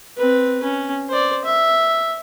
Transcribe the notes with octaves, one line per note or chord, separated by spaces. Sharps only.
C4 B4
C#4
C5 D5
E5